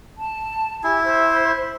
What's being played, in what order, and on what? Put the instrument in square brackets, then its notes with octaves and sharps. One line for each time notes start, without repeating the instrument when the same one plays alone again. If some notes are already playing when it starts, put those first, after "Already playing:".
[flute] A5
[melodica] E4 [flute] G4 [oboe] G#5
[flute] C5 [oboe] E5
[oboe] B5